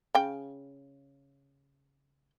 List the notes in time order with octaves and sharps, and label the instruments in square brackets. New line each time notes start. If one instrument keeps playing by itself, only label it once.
[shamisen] C#3 G5